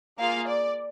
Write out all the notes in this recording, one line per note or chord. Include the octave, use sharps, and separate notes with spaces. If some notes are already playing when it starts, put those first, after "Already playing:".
A#3 F4 G#4 F5
D5